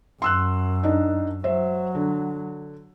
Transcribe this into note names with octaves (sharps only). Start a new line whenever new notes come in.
F#2 C6 E6 F#6
D4 D#4
F#3 C5 E5
D3